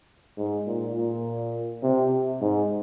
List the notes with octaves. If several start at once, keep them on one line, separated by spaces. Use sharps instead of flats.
G#2
A#2
A#2
C3
G#2